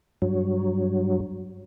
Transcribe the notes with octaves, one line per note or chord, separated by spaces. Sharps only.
G2 F#3